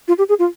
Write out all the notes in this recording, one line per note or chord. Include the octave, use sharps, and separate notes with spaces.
F4
G4
G#4
F4